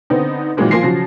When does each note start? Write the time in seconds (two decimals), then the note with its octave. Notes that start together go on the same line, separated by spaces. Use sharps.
0.10 D3 B3 C4 D#4
0.57 A#2 D#3 E3 F#3 G#3 A#3
0.71 F3 A#3 G#5 C6 A#6 C7
0.83 C#3 F3 F#3